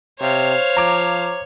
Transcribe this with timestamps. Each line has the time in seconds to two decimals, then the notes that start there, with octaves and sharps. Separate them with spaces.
0.21 C3 C5 C#5 F5
0.77 F3 A#5 D6 G#6